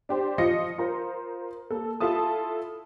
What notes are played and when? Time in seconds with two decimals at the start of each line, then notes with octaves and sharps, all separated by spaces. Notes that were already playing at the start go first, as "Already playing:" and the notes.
0.09 D4 G4 C5
0.38 F3 F4 D#5 D#6 A#6 C#7
0.78 F4 A#4 C5
1.71 A#3 A4
2.00 E4 F4 A4 E5 A5 D#6